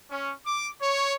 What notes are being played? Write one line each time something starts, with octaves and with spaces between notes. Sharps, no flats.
C#4
D6
C#5